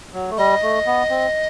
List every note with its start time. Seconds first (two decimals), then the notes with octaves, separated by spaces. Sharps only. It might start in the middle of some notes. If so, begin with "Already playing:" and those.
0.13 F#3
0.30 A3
0.38 G3 D#5
0.62 A3
0.86 B3
1.10 C4